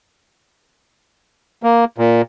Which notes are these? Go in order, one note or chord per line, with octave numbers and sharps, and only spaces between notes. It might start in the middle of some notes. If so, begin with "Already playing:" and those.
A#3
A#2